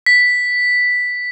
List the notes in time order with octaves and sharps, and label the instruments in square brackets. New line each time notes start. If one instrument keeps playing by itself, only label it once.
[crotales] B6